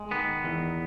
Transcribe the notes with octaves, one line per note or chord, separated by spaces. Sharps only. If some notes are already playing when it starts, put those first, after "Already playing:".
Already playing: G#3
D#3 B3
E2